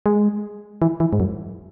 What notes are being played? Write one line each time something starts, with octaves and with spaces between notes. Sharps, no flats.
G#3
E3
E3
G#2
F#2